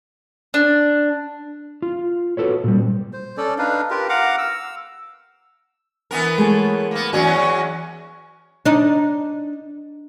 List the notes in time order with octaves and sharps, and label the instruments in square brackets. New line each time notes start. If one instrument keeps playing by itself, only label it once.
[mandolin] D4
[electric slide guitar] F4
F#4 G#4 A4 B4 C#5
A#2 G3
[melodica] C5
C#4 A4 D5
D4 D#4 B4 F5
F4 G4 A#4 B4
F5 F#5 A#5 D6
E6
[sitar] E3 B3 A#4
[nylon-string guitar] G#3 A3 C#5
[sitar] A#3 B3
[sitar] E2 F#3 C#4 [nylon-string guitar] F#4
[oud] D4 D#4